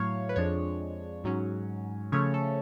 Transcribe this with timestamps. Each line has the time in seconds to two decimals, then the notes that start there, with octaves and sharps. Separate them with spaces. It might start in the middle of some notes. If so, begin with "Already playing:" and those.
Already playing: A2 F#3 A3 C#5 F5
0.29 B4
0.36 F2 F3 G#3 D4 C#5
1.24 G#2 F#3 C#4
2.12 C#3 F3 A3 C#4 C#5
2.34 A4